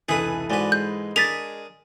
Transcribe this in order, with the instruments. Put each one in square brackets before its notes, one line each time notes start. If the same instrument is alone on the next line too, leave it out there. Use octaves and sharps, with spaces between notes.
[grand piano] F1 C#2 [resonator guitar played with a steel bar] E3 A4 [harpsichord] G#4 B4
[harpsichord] G#2 B4 [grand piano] F#4 D5 G#5
[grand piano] G#3 [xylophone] G6
[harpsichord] D4 G#4 A#4 [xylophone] A6 B6 F7